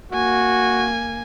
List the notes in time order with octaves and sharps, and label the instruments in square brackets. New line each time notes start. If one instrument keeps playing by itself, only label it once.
[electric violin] A#3 G#5 [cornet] F#4